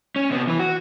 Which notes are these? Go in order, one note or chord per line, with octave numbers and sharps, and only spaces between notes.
C#4
C3 B3
E3 B4
F#4